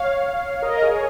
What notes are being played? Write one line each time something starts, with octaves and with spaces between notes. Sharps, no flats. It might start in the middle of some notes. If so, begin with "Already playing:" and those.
Already playing: C#5 F5
A#4 D#5
G#4 C#5